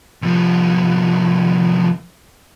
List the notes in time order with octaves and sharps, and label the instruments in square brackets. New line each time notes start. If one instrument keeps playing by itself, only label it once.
[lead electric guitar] C2 F3